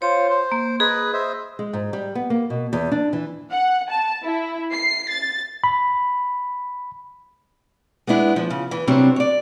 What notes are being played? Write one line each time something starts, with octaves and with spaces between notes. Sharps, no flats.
F4 C5 C#5
C5
A#3
G#4 B4 D#5
C5 D#5 E5
G#3
G#2
G3
B3
A#3
B2
E2
D4
E3
F#5
A5
E4
C7
A6
B5
G#3 B3 D4 E4
F3
C#3
E3
C3 F#3 G3 C4 D4
C#5 D5